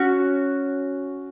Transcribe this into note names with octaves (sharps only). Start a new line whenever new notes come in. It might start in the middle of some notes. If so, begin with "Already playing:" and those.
Already playing: C#4 F#4